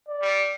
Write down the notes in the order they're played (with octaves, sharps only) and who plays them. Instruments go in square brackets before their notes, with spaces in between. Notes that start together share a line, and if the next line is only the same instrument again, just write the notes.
[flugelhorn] D5
[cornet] G3